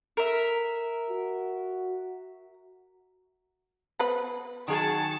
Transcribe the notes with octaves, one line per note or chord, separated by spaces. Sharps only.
A#4 E5
F#4
B3 B4 C5
D#3 F#3 G#4 A5 C#7